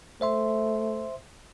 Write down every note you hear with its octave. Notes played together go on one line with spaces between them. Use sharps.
A3 C5 E5 C6